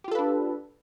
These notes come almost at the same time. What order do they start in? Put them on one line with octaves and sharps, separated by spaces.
G4 F4 A4 B4 D4